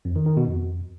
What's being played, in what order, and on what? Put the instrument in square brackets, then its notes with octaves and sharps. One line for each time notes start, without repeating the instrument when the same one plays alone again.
[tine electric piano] F2
D#3
D#3
B2
F2